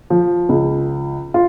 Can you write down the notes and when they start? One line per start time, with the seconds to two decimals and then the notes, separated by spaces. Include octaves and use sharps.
0.10 F3
0.49 C#2
1.34 F4